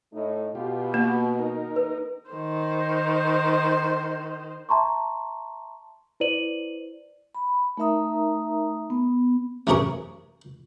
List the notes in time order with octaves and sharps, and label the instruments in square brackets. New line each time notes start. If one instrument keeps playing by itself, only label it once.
[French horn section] A2 A3 D#4
[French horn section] B2 [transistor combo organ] F4 G4
[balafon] A#3
[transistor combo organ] D#4 A#4
[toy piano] B4
[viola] D#3 C5
[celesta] E5 A5 A#5 C6 C#6
E4 B4 C5 D5 D#7 F#7
[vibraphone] B5
A3 D#4 A#4 E5 A#5 D#6
B3
[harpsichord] A1 F#2 C3 G#4 A#4 C#6